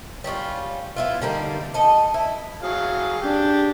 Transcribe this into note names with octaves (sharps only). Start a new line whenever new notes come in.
G3 C#4 D#4 F4
B3 E4 F4
D3 G3 A#3 D#4
A4 D#5
E4
F#3 G#4 F5
D4 G4